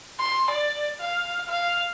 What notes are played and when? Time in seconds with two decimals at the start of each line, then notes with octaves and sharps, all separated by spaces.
0.20 C6
0.51 D5
1.00 F5
1.49 F5